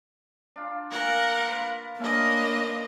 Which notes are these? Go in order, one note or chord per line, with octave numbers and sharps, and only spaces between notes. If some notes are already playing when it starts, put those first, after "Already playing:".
D4 F4
A#2 A#4 F#5
F4 B4
A3 A#3 C#4 D4 D#5